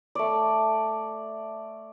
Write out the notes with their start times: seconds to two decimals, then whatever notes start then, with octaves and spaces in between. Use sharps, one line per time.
0.15 A3 D5